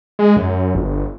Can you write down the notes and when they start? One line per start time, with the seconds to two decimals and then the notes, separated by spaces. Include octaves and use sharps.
0.19 G#3
0.37 F#2
0.75 G1